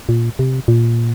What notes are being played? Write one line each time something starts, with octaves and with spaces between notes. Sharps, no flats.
A#2
C3
A#2